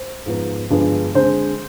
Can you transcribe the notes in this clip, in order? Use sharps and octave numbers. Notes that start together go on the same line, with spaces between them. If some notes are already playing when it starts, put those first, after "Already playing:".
Already playing: C5
G#2 F3 B3
G2 D3 F3 G#3 B3
D3 G#3 C4 C5